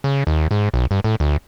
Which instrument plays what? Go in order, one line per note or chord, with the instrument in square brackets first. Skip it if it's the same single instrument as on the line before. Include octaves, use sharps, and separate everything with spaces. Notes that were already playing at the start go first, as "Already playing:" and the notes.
[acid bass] C#3
D#2
G#2
B1
G2
A2
D2